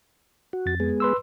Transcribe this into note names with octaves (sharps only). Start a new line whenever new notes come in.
F#4
F2 A6
G#3 B3 G#4
B4 C6 E6